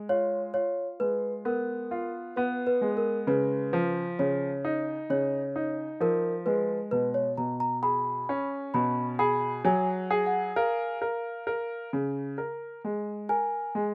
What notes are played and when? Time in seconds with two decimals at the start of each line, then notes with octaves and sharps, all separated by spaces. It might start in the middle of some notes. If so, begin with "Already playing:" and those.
Already playing: G#3
0.09 F4 C#5
0.54 F4 C#5
1.00 G#3 B4
1.45 B3 A#4
1.91 F4
2.36 B3 B4
2.67 B4
2.81 G#3
2.97 A#4
3.27 C#3 B4
3.73 F3
4.19 C#3 C#5
4.65 D#4
5.10 C#3 C#5
5.56 D#4
6.00 F3 A#4
6.46 G#3 B4
6.91 B2 B4
7.14 C#5
7.38 B2 A#5
7.60 A#5
7.82 G#4 B5
8.29 C#4
8.74 B2 B5
9.19 G#4 B5
9.65 F#3 G#5
10.11 G#4
10.26 F#5
10.56 A#4 F5
11.02 A#4
11.47 A#4
11.93 C#3
12.38 A#4
12.85 G#3
13.29 A#4 G#5
13.75 G#3